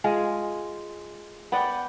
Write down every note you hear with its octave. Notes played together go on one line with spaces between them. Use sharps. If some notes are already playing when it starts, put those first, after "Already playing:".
G#3 F4 G#4
B3 D5 F#5 G5